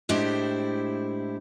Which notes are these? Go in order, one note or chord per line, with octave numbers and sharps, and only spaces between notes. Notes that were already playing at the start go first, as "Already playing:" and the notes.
A2 G#3 D4 E4 G4 C5